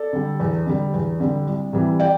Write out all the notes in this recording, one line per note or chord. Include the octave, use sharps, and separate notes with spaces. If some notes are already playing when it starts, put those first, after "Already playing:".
Already playing: A4 D5
D3 G3
E2
D3 G3
E2
D3 G3
C2
C3 E3 G3
D5 G5